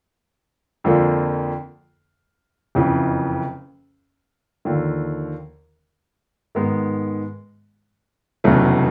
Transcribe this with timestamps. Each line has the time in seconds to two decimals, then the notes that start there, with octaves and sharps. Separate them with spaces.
0.84 F2 D3 F3 A#3
2.75 F#1 F2 C#3 E3
4.65 D#2 D3 F3
6.55 G#2 D#3 G#3 B3
8.44 F1 E2 C#3 F#3 A3